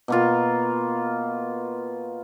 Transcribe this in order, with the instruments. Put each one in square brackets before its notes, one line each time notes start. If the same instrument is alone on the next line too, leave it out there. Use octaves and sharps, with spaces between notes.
[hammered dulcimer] B2 A#3 F4